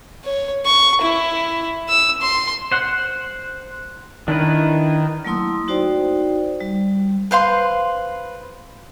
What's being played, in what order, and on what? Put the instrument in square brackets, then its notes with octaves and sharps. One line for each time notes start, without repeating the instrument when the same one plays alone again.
[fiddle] C#5
C#6
E4
E6
C6
[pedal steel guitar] C5 F#5
[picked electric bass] D#3 [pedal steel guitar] D4 E4 B4
[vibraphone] F#3 A3 A#3 E4 C6 D#6
D#4 F#4 C5 D5 G5
G3
[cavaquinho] B4 C5 F5 C6